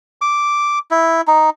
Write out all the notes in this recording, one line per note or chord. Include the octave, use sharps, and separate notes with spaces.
D6
E4
D#4